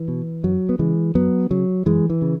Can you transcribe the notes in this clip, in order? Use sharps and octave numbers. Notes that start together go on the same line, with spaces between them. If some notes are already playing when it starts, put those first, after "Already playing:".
Already playing: E3
B2
F#2 F#3
B3
C#3 E3 G#3
F#2 F#3 B3
C#3 F#3
F#2 E3 G#3
E3
C#3